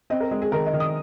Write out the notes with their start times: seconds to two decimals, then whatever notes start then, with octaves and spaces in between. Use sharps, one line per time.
0.10 C4 D#5
0.20 A#4
0.31 G#3 G#4
0.42 G#4
0.52 D#3 A#4
0.66 D#5
0.73 D#3
0.80 D#6